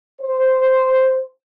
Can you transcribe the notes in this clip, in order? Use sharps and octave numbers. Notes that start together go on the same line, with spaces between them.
C5